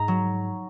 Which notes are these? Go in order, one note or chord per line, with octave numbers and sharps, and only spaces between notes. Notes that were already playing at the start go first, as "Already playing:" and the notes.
Already playing: G#2 A#5
F#3